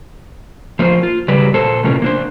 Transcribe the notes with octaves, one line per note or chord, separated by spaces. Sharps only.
F3 A#3 F4 B4 C5
F4
C#3 F#3 G3 G4 B4
A#2 A#3 A4 C5
A2 C3 E3 C#4 F4 A#4
A#3 D4 C5